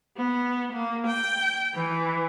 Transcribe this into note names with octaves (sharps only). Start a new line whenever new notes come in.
B3
A#3
G5
E3